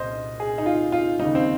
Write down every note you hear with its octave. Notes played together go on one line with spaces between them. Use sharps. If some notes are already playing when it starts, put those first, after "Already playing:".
Already playing: C2 A#2 C5 D#5
G#4
D#4
F4
F4
D#2 C#3 G3 D#4
C4